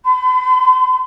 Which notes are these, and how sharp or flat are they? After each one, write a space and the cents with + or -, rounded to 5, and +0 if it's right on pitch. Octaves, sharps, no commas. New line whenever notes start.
B5 +45